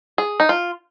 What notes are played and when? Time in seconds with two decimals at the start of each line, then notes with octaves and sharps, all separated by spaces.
0.18 G#4
0.40 D#4
0.49 F4